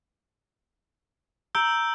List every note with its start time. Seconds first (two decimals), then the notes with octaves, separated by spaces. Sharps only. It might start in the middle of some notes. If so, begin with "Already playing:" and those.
1.55 A#5 E6 G6 D7 G7